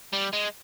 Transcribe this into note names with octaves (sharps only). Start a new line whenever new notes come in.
G3
G#3